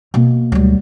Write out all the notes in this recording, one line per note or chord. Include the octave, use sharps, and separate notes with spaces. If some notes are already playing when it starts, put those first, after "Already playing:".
B2 A#3
D2 F#3 G3